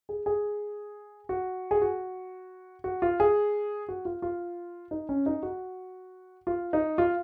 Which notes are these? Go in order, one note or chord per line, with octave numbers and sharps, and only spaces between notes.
G#4
G#4
F#4
G#4
F#4
F#4
F4
G#4
F#4
F4
F4
D#4
C#4
D#4
F#4
F4
D#4
F4